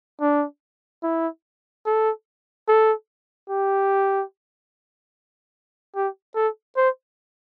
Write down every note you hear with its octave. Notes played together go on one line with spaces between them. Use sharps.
D4
E4
A4
A4
G4
G4
A4
C5